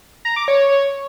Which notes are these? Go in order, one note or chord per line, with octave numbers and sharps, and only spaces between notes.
A#5
D6
C#5